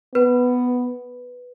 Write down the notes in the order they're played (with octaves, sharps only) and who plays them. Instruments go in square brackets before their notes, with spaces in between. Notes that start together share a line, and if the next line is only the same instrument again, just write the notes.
[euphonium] B3 [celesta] B4